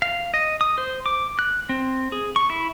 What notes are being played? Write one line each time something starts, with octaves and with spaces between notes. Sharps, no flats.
F5
D#5
D#6
C5
D6
F#6
C4
G#4
C#6
E4